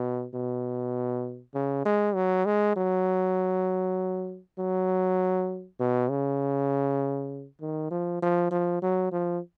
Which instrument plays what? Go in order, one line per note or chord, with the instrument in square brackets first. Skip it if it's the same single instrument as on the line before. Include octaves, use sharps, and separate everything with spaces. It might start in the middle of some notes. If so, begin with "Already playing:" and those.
Already playing: [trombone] B2
B2
C#3
G#3
F#3
G#3
F#3
F#3
B2
C#3
D#3
F3
F3
F3
F#3
F3